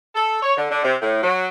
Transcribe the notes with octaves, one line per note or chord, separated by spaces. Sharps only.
A4
C#5
D3
D3
C3
A2
F#3